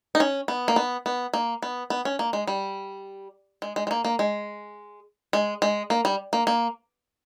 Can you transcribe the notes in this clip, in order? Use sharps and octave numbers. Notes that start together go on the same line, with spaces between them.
D#4
C#4
B3
A#3
B3
B3
A#3
B3
B3
C#4
A#3
G#3
G3
G#3
G#3
G#3
A#3
A#3
G#3
G#3
G#3
A#3
G3
A#3
A#3